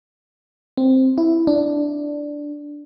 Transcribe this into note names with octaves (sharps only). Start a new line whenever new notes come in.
C4
E4
D4